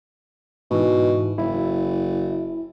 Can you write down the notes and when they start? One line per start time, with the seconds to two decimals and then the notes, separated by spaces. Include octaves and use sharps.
0.71 G#2 B2 E3
1.38 F#1 E4